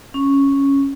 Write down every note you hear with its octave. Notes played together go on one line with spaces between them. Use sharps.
C#4